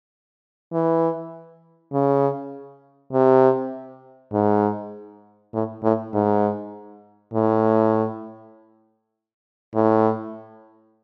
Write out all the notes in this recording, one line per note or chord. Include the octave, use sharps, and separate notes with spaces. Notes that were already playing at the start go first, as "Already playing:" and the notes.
E3
C#3
C3
G#2
A2
A2
G#2
A2
A2